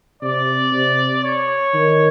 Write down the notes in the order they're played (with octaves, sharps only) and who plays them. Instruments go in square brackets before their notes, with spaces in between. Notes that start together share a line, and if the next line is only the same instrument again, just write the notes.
[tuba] C3 [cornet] D5
[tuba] C3
[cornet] C#5
[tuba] D#3